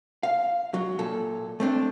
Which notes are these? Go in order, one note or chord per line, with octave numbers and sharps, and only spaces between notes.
F5
F#3
A#2 A4
A3 C4 D4